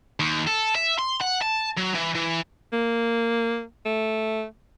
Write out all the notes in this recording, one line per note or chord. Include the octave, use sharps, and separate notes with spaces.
D#2
A4
E5
C6
F#5
A5
F#3
E3
E3
A#3
A3